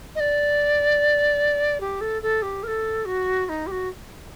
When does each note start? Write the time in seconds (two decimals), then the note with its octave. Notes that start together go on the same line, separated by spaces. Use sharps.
0.15 D#5
0.20 D5
1.80 G4
2.01 A4
2.22 A4
2.42 G4
2.63 A#4
2.67 A4
3.05 F#4
3.46 F#4
3.49 D#4
3.67 G4
3.71 F#4